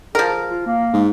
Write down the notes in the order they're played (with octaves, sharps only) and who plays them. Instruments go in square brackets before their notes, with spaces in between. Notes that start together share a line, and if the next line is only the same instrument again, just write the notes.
[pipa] F3 A#4 [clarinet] G#4
[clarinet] F4
A#3
[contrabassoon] G#2